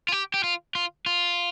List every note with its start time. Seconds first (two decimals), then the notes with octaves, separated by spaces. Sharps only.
0.08 F4
0.12 G4
0.34 G4
0.44 F4
0.75 F4
1.06 F4